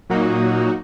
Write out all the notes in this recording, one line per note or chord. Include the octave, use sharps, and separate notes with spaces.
A#2 F#3 A#3 D#4 F#4